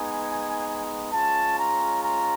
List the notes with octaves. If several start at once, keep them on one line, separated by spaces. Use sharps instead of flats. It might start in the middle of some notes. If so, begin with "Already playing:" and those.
Already playing: G#3 B3 D#4 G#5
G#3 C#4 F4 A5
A#5
A#5